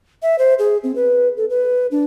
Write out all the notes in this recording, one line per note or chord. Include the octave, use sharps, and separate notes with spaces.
E5
C5
G#4
C4
B4
A4
B4
D4